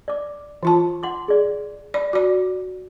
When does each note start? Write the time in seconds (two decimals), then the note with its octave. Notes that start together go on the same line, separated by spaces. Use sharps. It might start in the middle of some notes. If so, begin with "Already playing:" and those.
0.08 D5 D6
0.63 E3 F4 A5
1.03 F#5 C6 D6
1.28 G#4 D5
1.94 D5 B5
2.13 F#4 D5